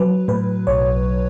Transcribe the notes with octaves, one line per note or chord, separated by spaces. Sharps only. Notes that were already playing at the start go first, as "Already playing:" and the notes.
Already playing: F#3 B4
A2 B4
B1 C#5